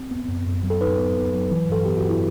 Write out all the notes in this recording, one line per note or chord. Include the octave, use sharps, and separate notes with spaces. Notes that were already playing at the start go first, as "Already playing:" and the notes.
Already playing: C4
B3
F#2
F#2
F#3
A4
D#4 B4
B3
B3
F#3
E3
G2 A4
B3 G4
F#4
G2 E4